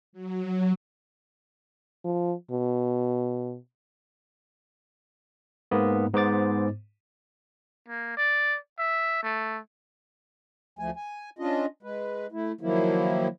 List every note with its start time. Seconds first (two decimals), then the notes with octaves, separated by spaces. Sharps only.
0.13 F#3
2.05 F3
2.51 B2
5.71 G#2 A#3 B3
6.13 G#2 B3 C5 D6 A6
7.88 A#3
8.17 D5
8.79 E5
9.23 A3
10.79 D2 F3 A3 G#5
10.96 G#5
11.39 C#4 D4 F4 D#5
11.83 G#3 B4
12.32 A3 E4
12.61 D#3 F3 F#3 A#3 E4